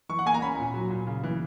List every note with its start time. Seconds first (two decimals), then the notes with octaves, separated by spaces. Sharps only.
0.09 E3 C#6
0.19 F#5
0.26 A#3 G#5
0.34 A#5
0.42 C#4 B5
0.58 A#2
0.74 F#3
0.90 A#2
1.07 C#3
1.23 E3